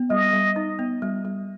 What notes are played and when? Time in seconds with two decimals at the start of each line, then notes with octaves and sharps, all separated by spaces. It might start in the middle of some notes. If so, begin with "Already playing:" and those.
Already playing: B3
0.10 G3 D#5
0.33 G3
0.56 D#4
0.79 B3
1.02 G3
1.25 G3